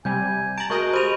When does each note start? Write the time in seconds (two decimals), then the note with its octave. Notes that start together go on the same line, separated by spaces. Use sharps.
0.05 C3 G3 G#5 G6
0.58 A5 A#5 D7 F#7
0.70 G#3 F#4 A#4 D#5 C#6 G6
0.93 G4 C5 B5 D#7 F7